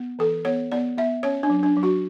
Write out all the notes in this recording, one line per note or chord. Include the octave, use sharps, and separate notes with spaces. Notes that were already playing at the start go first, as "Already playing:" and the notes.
Already playing: B3
E3 A4
B3 C#5
B3 D5
B3 E5
C#4 C#5
D4
F#3
D4
F#3
F#4